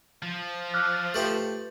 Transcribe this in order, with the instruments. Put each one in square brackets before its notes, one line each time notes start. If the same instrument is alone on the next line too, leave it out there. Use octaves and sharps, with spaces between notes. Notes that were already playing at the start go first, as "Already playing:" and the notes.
[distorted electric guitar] F3
[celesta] D6 F6 F#6
[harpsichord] A3 G4 C5 [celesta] F4 B4 F#7